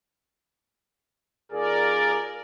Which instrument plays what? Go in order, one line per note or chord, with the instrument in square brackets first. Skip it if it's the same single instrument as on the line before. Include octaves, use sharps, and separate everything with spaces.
[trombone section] D#2 F4 G#4 [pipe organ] A#4 D5